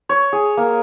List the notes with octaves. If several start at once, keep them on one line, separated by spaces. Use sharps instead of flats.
C#5
G#4
A#3